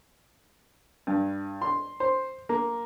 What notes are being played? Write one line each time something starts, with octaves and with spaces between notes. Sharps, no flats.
G2
C6
C5
A#3